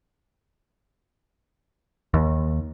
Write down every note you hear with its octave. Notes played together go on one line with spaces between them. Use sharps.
D#2